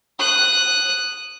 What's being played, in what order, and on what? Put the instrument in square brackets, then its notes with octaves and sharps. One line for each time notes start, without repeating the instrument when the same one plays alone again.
[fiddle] D#6 F#6